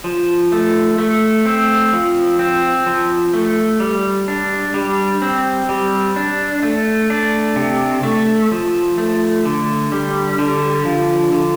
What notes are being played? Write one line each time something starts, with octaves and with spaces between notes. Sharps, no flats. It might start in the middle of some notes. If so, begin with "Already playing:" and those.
F3
A3
A3
C4
F3
C4
F3
A3
G3
D4
G3
C4
G3
D4
A3
D4
C3
A3
F3
A3
D3
G3
D3
F3
D3